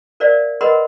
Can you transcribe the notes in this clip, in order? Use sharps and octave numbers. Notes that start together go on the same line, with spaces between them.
A#4 C5 D5 E5 F5
A#4 B4 D#5 F#5 B5 C6